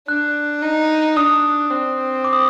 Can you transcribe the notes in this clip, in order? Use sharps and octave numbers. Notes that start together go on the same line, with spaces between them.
D4 F#6
D#4
D4 D#6
C4
D6
D#6